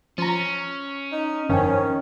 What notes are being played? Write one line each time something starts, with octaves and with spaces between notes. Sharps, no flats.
F3 C#4 A#5
D#4
G1 F2 D#3 C4 C#4